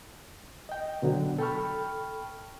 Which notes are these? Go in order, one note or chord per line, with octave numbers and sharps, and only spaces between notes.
D#5 G5
B2 D3 F#3
A4 G5 A5 B5 C#6 F6